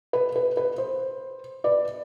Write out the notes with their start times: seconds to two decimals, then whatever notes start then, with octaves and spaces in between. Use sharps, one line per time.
0.13 B4
0.36 B4
0.57 B4
0.78 C5
1.64 B4 D5